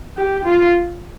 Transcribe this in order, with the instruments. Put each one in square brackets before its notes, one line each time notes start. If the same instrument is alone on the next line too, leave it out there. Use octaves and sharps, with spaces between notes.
[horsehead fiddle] G4
F4